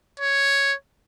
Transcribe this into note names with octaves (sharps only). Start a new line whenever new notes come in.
C#5